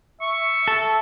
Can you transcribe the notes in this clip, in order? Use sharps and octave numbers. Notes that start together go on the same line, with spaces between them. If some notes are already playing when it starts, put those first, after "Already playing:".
E5 C#6
A4